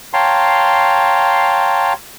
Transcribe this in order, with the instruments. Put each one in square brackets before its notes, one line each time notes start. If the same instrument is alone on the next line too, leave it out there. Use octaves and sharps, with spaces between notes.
[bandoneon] C#5 F5 G5 A5 A#5 C6